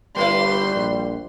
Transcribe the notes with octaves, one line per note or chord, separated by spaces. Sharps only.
G1 G3 A3 E4 B4 C6
A#1